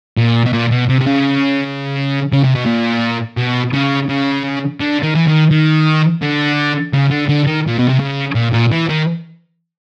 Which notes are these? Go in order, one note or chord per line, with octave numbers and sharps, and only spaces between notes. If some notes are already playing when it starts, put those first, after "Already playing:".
A#2
B2
A#2
B2
C3
C3
C#3
C#3
C3
B2
A#2
B2
C#3
C#3
D3
D#3
E3
D#3
D#3
D3
C#3
D3
D3
D#3
A#2
B2
C3
C#3
A#2
A#2
E3
D#3